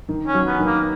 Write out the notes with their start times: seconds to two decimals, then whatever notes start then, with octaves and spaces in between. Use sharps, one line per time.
0.09 D#3
0.27 C#4
0.34 F#3
0.47 B3
0.59 D#3
0.66 A#3